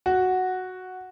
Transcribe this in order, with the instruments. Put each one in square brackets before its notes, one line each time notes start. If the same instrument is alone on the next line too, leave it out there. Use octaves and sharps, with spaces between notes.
[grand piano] F#4